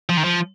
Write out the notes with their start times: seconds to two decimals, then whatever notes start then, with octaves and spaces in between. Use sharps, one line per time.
0.09 F3
0.17 D#3
0.24 F3